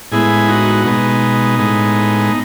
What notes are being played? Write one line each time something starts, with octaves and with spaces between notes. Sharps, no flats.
A2 G#3 B3 E4 G#4
D#4 F#4
B2 G#3 B3 D#4
A2 G#3 B3